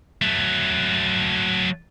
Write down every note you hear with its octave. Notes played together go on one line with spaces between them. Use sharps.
F#3 A3